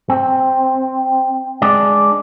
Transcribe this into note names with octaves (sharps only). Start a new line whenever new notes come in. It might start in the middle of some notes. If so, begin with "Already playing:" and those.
C4
G#3 D4 D5